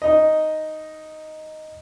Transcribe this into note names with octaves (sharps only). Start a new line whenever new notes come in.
D#4 D#5